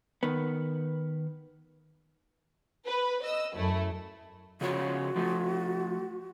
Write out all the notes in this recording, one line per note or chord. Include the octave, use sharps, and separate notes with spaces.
D#3 B3
B4
D#5 E6
F#2 A3 E4
C#3 F3 F#4 C#5
F3 A3